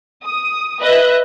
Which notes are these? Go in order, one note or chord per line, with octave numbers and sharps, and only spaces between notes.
D#6
B4 D#5 E5 F#6